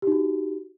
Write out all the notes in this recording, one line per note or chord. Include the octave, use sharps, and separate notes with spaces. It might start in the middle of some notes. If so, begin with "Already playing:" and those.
D#4 F#4 G4